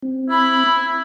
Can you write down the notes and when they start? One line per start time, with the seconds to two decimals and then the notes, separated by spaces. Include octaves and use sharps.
0.02 C4
0.30 E4 B5